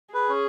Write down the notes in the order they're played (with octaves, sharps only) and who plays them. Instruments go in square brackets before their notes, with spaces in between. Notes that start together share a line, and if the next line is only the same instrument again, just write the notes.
[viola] G#4 [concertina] B4
[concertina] C#4